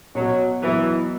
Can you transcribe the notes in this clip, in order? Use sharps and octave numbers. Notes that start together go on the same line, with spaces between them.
B2 F#3
E3 F#3 B3 E4